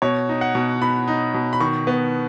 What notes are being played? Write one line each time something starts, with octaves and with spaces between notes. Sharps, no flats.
B2 C#5
D#4
F#5
B2
B2 B5
D#4
B2
B5
D#3 C#6
B3